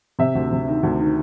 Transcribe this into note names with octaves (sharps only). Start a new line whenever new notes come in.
C3 E5
D2
C3
D#3
D2
D#3